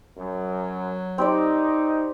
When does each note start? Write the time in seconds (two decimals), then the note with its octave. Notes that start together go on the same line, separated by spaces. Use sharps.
0.17 F#2 F#3
1.18 C4 D#4 G4 D5